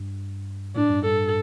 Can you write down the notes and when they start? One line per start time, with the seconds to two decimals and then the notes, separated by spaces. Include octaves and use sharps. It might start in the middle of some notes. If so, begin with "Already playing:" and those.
Already playing: G2
0.76 A2 D4
0.90 G2
1.06 G2 A4